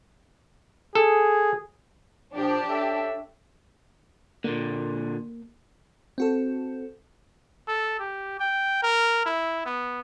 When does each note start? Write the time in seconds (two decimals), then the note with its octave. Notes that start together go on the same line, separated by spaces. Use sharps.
0.95 G#4 A4
2.34 A#2 F3 D4 G4
2.68 A4 C#5 E5
4.44 A#2 D3 A#3
6.18 C4 F#4 A4
7.68 A4
7.99 G4
8.40 G5
8.83 A#4
9.26 E4
9.66 B3